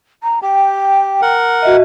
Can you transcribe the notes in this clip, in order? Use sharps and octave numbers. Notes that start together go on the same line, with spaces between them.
A#5
G4 G5
A#4 F#5
F#4 D#5 E5